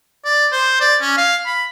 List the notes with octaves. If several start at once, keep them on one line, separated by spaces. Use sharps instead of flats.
D5
C5
D5
C#4
F5
B5